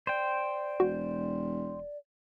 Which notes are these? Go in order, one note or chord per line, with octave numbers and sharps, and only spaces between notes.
C5 D5 G5
E1 F#4